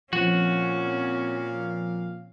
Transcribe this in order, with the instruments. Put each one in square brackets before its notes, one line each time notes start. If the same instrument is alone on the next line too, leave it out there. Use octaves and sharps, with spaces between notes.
[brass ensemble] A#2 F5 [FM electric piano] F3 C4 [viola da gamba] C#4 [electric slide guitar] F#4